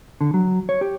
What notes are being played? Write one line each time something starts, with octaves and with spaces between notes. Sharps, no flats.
D3
F#3
C#5
G4